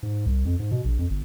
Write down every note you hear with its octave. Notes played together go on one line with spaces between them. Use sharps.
G#2
C2
F2
G#2
B2
A#1
F2
G1